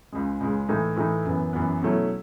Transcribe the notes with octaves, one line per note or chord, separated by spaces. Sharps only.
C#2 C#3 G#3
C#2 C#3 G#3
A2 E3 A3 D#4
A2 E3 A3 D#4
F#2 E3 B3
F#2 E3 B3
B2 F#3 A3 C#4 E4